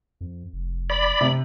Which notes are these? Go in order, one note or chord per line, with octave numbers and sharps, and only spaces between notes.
F2
F1
D5 B5
C3